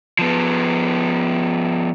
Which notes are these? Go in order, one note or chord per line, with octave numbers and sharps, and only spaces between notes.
F3 B3